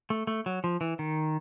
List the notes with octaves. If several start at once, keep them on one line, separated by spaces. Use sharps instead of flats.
A3
A3
F#3
F3
E3
D#3